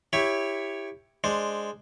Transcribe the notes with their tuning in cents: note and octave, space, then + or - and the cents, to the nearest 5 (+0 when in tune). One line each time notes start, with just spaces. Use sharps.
E4 +0 G4 +15 C#5 +0
G#3 +0 D4 +0 C5 +0